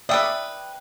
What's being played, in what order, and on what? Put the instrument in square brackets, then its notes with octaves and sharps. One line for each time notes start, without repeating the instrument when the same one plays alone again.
[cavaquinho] B4 G5 D#6 [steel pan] D5 E5